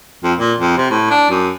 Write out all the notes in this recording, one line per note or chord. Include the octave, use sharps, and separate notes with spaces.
F2
A#2
F2
C3
A2
D4
F#2